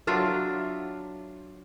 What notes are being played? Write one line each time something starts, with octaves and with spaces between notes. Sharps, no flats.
F#3 D4 F4 E5